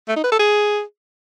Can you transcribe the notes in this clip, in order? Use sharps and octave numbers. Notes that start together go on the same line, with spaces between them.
A3
D#4
B4
A4
G#4